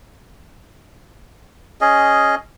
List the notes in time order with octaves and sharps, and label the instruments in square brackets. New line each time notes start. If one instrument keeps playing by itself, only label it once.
[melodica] C#4 G#4 D#5